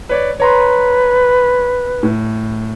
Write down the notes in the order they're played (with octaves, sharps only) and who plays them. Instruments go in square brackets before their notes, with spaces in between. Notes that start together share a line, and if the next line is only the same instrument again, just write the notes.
[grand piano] B4 C#5 D5
[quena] B4 [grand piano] C#5 A#5 C6
[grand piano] A2